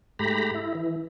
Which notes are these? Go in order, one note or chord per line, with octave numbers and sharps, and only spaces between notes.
G#2 A3 G4 A#5 B5
E4
E3